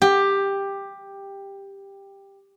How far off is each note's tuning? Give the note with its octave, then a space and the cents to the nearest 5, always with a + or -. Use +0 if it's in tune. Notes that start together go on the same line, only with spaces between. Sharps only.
G4 +10